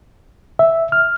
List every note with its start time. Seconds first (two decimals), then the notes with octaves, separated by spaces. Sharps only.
0.59 E5
0.92 F6